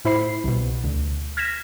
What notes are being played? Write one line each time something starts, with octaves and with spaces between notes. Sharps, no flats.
A2 E4 C5 B5 C7
C2 B2
D2
F6 G#6 A#6 B6 E7